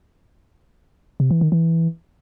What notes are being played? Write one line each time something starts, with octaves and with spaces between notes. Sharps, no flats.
C3
E3
D#3
E3